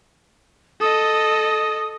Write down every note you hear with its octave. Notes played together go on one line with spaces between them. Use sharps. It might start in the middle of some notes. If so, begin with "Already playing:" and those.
A4 D#5 D#6